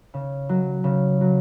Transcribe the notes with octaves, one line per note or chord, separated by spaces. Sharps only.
C#3
F#3
C#3
F#3